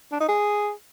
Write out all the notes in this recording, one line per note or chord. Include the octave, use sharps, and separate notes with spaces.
D4
D#4
G#4